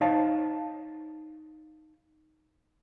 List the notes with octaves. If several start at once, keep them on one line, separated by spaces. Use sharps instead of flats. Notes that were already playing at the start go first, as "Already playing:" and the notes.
D#4 C5 C#5 F5 A5